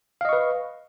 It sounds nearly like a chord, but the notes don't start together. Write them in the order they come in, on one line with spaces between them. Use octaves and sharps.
F5 D#5 C#6 B4